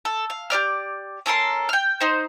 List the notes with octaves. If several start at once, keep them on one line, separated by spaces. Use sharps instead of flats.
A4
F5
G4 B4 D5 F6
C#4 A4 A#4 C6
G5 F6
D#4 C5